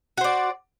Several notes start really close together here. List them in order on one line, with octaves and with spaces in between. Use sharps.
F#4 C5 D5